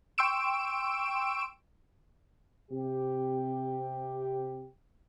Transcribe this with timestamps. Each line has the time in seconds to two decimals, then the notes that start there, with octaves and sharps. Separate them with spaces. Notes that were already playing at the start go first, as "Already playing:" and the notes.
0.18 G5 C6 C#6 E6 D7 E7
2.71 C3 G4